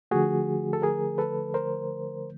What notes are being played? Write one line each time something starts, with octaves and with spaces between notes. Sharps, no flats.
D3 F3 A3 F#4 G#4
A4
G#4 A#4
A4 B4
A#4 C5